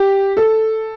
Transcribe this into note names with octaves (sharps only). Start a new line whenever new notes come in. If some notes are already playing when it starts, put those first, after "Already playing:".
Already playing: G4
A4